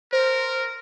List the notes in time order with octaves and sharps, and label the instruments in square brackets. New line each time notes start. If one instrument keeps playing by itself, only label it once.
[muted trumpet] A#4 [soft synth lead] C5